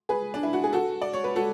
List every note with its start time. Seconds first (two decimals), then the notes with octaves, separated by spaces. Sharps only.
0.09 G#4 B4
0.34 D4
0.43 E4
0.53 F#4
0.64 G#4
0.73 F#4 A4
1.02 D5
1.13 C#5
1.24 B4
1.36 F#4 A4